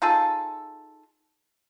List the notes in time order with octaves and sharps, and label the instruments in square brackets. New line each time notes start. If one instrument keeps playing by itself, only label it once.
[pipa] D#4 F4 G#4 A4